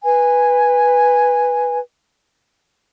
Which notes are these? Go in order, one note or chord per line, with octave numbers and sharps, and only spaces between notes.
B4 G#5